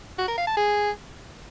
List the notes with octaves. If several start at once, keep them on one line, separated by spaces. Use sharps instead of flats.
F#4
A#4
F5
A5
G#4